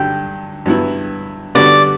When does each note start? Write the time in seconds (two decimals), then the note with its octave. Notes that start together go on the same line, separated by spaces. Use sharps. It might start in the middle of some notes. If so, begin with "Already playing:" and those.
Already playing: G2 D3 F#3 G5
0.66 G2 F#3 B3 E4
1.55 D3 G3 B3 F#4 D5